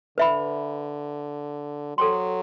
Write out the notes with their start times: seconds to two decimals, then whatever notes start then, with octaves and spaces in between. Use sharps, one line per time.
0.18 D3 B4 E5 B5
1.98 F#3 A4 C5 G5 C6